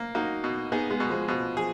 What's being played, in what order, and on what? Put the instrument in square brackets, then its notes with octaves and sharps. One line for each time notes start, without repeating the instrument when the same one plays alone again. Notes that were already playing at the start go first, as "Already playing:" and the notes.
Already playing: [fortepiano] A#3
[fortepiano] A#3 [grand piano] D#4 F#4
[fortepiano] B2
[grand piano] B3 D#4 [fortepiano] G#4
[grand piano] G#3 B3
[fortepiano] B2
[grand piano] F3 G#3
[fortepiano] B2 [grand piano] F3
[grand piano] F3 [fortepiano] G#4